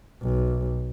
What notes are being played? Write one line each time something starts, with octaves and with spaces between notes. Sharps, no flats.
B1